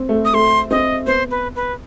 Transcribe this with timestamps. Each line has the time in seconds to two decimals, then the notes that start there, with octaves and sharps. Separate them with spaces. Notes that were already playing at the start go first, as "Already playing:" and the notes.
Already playing: C4
0.09 A3
0.25 D#6
0.34 A3 C6
0.71 C4 D#5
1.07 B3 C5
1.31 B4
1.56 B4